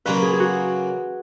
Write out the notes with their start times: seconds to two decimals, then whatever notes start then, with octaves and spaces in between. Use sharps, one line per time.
0.06 C#3 F#3 A#3 C#4 F4 B4
0.22 G#4
0.33 G#4
0.40 F#4